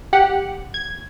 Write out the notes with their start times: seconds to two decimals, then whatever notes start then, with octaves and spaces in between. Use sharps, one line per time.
0.13 G4 F#5
0.74 G#6